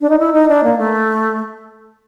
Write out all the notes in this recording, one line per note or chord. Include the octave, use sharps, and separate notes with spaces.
D4
D#4
E4
D#4
D4
A#3
A3